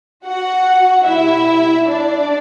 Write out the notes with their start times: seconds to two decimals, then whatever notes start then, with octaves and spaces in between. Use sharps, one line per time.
0.25 F#4 F#5
1.05 B2 G3 E4 E5
1.86 D4 D5